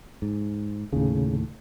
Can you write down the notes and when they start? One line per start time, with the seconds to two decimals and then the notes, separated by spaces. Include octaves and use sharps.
0.22 G#2
0.93 D#2 A2 C#3